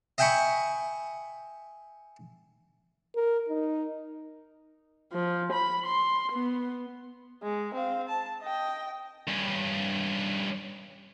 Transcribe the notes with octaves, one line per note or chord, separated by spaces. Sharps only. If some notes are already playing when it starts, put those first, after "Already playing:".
D#5 E5 G5 G#5 B5 C#6
A#4
D#4
F3
B5
C6
B3
G#3
C4 F5
A5
D#5 G5
G2 C#4